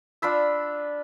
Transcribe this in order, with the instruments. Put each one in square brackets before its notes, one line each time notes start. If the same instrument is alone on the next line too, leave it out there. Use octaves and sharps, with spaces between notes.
[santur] D4 F4 B5 E6